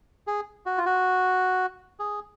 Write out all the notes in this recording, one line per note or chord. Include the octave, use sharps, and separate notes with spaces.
G#4
F#4
F4
F#4
G#4